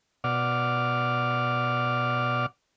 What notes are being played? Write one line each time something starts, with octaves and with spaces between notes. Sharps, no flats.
B2 D5 F#5 D6 F6